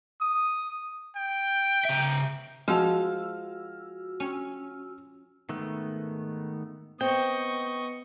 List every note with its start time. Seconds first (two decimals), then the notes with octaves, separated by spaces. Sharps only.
0.21 D#6
1.16 G5
1.85 C#3 E5
2.68 F3 G#3 F#4 E6 F6
4.20 C#4
5.49 G#2 D#3 A3 B3
7.01 B3 C4 D#5 G5 C#6